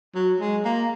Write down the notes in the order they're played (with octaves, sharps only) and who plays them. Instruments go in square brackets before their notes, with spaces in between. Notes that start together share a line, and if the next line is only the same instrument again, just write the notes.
[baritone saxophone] F#3
G#3
A#3